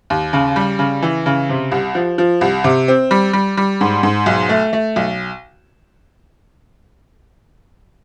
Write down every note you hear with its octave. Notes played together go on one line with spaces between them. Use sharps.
D#2
C#3
G3
C#3
E3
C#3
C3
C2
F3
F3
C2
C3
C4
G3
G3
G3
G#2
G#2
B1
A3
A3
B1